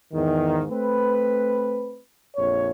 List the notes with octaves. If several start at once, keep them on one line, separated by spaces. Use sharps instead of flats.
E2 G#2 D#3
A3 C4 B4
A#1 F2 C#5